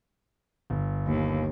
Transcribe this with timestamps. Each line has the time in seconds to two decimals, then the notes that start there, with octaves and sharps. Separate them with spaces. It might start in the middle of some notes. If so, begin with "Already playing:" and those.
0.70 G1
1.07 D#2